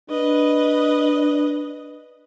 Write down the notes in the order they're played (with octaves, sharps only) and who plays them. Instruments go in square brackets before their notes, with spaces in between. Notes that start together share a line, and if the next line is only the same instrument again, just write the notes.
[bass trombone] D4 [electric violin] B4 D#5